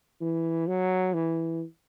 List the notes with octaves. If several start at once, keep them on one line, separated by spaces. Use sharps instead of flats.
E3
F#3
E3